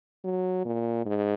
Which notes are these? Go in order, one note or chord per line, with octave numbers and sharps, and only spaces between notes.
F#3
A#2
G#2